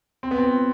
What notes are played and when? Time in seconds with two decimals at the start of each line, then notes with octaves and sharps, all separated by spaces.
0.23 C4
0.31 B3
0.38 C4